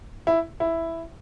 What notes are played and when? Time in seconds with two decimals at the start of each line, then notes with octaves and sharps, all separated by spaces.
0.27 E4
0.60 E4